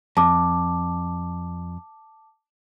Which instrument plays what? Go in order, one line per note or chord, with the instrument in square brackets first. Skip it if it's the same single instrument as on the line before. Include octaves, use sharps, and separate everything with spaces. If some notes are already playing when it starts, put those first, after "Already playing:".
[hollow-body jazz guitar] F2 [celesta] A5 D6